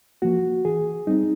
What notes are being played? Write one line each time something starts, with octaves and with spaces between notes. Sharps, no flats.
F3 A#3 F#4
E3 G#4
G3 C4 D#4